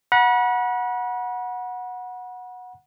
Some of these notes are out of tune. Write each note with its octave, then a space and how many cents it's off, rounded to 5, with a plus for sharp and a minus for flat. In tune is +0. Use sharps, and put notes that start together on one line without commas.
F#5 -15 B5 -40